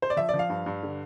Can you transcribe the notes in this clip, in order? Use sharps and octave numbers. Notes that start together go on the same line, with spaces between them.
C5
D5
F3 E5
D5
F3
F5
G2
G2
D3